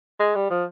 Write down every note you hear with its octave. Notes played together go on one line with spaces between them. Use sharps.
G#3
G3
F3